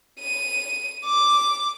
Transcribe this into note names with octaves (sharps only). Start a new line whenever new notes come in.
D#7
D6